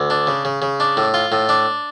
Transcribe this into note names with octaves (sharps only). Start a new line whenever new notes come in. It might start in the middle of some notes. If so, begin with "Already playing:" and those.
Already playing: D2
D4
C#3
C#3
C#3
D4
A2
F4
A2
D4